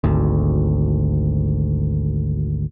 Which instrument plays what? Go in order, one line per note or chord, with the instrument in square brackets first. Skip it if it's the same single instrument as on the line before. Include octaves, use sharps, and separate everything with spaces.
[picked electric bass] G#1 D2